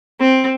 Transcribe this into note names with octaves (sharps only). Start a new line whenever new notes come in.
C4